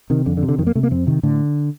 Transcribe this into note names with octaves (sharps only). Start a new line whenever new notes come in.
C3 D#3
F2 D3
D3
C3
D3
F2 D#3
A#3
C3 A3
A#3
F2 C4
C3 D#3
A2 D3